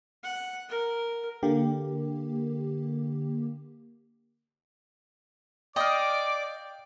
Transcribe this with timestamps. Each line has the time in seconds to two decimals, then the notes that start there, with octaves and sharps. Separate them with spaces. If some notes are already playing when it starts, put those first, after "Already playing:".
0.24 F#5
0.69 A#4
1.43 D3 A#3 G4
5.76 D5 D#5 F5 G5 D6